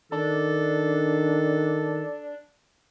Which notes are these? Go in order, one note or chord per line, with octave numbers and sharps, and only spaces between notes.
D#3 D4 A4